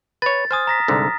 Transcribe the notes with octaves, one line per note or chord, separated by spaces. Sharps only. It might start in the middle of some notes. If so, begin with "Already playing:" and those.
B4 C#5 A6
C5 G#5 D#6 F6
A#5 A#6 B6
C2 G#2 D3